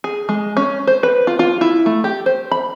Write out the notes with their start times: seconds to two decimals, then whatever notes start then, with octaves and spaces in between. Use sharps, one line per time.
0.04 G#4
0.29 G#3
0.57 C#4
0.87 C5
1.03 B4
1.27 F4
1.39 F4
1.61 E4
1.86 A3
2.04 G4
2.26 C5
2.51 B5